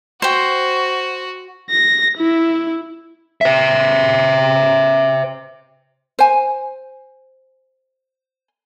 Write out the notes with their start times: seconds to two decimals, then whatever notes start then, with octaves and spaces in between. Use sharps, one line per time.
0.22 F#4 C5 G5
1.70 A#6
2.17 E4
3.41 C5 E5
6.19 C5 G#5